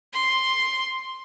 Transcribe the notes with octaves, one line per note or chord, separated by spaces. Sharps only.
C6